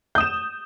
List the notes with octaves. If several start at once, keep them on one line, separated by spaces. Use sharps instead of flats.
D#6 G6 E7